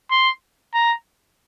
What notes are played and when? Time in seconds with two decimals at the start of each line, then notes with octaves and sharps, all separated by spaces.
0.11 C6
0.74 A#5